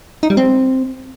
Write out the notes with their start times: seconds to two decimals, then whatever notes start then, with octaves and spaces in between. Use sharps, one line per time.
0.23 D#4
0.30 G3
0.37 C4